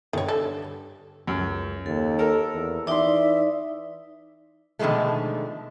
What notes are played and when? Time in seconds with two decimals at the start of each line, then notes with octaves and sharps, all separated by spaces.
0.13 G2 D3 D#3 C#5
0.28 A4
1.27 C#2 F#2
1.86 D#2 A4
2.19 A4 A#4 E6
2.54 E2
2.87 E3 D#4 D5 E5 C6 D6
4.79 B2 D3 D#3 F3 G#3 A3